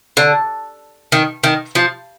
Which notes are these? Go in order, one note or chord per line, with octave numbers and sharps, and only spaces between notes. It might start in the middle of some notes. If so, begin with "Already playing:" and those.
D3
D#3
D#3
F3